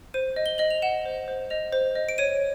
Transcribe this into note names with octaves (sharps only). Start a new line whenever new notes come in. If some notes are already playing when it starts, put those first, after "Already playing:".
C5 D#7
D#5
G7
D#5 F#7
F7
F#5 E7
C5
C5
D#5 F7
C5
D#5
D7
C#5 D#7